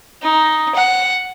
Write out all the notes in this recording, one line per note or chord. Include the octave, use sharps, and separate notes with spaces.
D#4
F#5